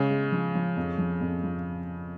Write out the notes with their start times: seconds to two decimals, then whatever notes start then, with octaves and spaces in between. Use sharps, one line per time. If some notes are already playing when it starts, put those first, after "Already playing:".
Already playing: C#3 G#3
0.10 G#3
0.32 F3
0.55 F3
0.77 F2
0.98 F3
1.21 F2
1.44 F3